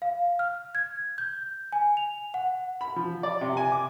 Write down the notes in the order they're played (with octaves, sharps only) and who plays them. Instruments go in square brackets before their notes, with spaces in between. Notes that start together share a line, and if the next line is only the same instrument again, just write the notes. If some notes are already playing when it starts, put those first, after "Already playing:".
[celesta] F5
F6
G#6
G6
G#5
F7
F#5
[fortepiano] B5
F3
D5
C3
G#5
D6